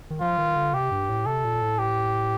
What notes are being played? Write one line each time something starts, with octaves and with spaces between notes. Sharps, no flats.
D#3
F3 F4
D#3
D3
C3 G4
G2
A2
C3 A4
A#2
A2
G4